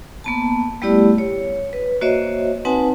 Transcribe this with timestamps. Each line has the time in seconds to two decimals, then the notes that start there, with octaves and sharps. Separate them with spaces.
0.24 A#3 B3 A5
0.82 G3 A3 B3 E4 G4 D5
1.18 C#5
1.73 B4
2.01 A#3 F#4 C5 C#5 D#5 E5
2.65 C4 D#4 B4 F#5 G#5 A5